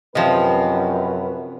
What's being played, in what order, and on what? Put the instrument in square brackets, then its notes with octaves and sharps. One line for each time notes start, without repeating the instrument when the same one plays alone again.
[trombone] F#2 [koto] C3 F3 [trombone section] B4 [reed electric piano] D#5 G5